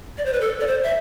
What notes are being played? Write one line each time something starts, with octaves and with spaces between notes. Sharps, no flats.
D5
C5
B4
A4
D5
C5
E5